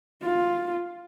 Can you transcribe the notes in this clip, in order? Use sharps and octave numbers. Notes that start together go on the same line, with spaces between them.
F4